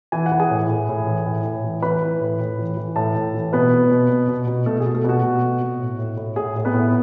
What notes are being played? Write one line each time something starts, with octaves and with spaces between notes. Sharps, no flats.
E3 G#5
F#5
E3
G#4 G#5
A2
A2
A2
E3
A2
A2
E3
E3 B4 B5
E3
A2
A2
E3
E3
A2 A4 A5
A2
E3
B2 B3 B4
B2
B2
B2
B2
B2
B2 A3 A4
G#4
B2
A3 A4
B2 F#4
B2
B2
B2
A2
A2
A2
A2 G#4
A2
B3 B4
A2